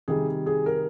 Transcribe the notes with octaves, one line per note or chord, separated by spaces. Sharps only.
C3 D#3 G3 G#4
G#4
A#4